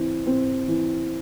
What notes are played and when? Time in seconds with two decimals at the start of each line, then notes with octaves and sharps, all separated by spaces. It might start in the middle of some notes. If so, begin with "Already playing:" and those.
Already playing: E3 C4
0.27 C4
0.68 E3